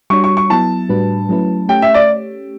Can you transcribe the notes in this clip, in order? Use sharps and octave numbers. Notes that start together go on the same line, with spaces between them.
G3 D4 F#4 C#5 C#6
C#6
C#6
F#3 B3 E4 A5
A2 G3 D4 F#4 B4
F#3 A3 C#4 E4 B4
A3 C#4 G4 C#5 G5
E5
D5